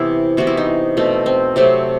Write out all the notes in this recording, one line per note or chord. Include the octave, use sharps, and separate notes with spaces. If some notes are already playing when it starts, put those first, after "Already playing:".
Already playing: C3 E3 B3 E4
C3 E3 B3 F#4
E4
D#4
B2 A3 C4
C4
C3 F#3 A3 C4